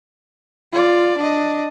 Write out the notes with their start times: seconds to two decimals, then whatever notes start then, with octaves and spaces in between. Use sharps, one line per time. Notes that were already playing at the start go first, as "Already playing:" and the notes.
0.72 F4 D5
1.18 D4 D#5